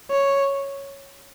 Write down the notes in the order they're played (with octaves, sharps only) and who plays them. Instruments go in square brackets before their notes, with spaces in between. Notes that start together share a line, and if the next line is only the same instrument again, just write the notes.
[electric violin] C#5